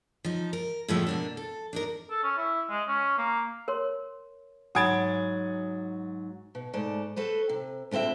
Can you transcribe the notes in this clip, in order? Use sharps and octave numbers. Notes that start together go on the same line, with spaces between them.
F3 D#4
A#4
A2 C#3 F3 G#3 A3 B3
B2 A#3 D4
A4
D4 D#4 A#4
A4
C#4
E4
G#3
C#4
A#3
A#4 C#5 C6
G#2 F#3 F#5 G#5 B5 D#6 G#6 A6
B2
G#2 A3 D5 A5
F#4 A4 B4 C5
C3
D2 D3 C4 F4 E5